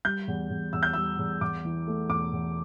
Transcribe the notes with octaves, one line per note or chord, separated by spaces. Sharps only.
G3 G6
E2
E2
E2 E6
G6
G3 E6
E2
E2 D6
E3
A3
E1 D6
E2